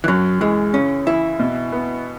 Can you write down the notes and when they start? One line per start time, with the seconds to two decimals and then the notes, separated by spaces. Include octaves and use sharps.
0.04 E3
0.08 F#2 F#3
0.41 E3 G#3
0.73 C#3 C#4
1.07 E3 E4
1.39 B2
1.72 B3